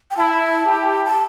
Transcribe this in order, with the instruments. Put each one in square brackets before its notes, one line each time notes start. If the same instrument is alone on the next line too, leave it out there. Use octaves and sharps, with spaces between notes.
[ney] G5
[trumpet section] E4 [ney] A5
[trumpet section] E4 G4
[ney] A5